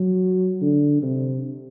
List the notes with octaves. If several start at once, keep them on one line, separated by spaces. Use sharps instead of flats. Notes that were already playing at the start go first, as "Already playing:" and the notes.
Already playing: F#3
D3
C3